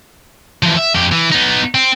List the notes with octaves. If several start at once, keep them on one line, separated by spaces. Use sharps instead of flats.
E3 F3
E5
F2 G4
E3
B3 D#4
C4